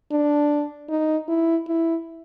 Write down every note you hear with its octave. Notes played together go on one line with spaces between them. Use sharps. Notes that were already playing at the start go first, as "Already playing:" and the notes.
D4
D#4
E4
E4